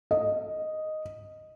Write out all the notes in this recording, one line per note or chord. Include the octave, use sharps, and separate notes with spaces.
D#5